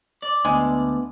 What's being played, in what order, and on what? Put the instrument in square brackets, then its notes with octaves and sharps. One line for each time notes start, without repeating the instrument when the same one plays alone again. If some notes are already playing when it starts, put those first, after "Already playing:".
[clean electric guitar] D5
[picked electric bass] D2 [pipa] G#3 [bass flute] B3